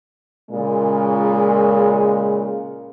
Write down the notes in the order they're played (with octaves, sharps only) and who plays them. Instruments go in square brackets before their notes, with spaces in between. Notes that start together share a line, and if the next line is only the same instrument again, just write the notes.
[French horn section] A#2 C#3 G#3